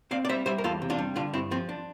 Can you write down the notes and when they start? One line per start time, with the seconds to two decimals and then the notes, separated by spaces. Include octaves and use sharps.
0.11 C4 D5 F5
0.25 D5
0.29 G3 C5 E5
0.46 G3 C5 E5
0.58 A#4
0.64 E2 F4 A4
0.82 C3
0.90 D4 F4
0.98 G3
1.16 D3 D4 F4
1.33 G2 C4 E4
1.51 F3 C4
1.69 D4